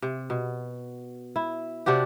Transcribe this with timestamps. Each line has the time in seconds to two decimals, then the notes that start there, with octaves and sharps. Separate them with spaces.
0.02 C3
0.30 B2
1.36 E4
1.86 C3 D4 F#4 G4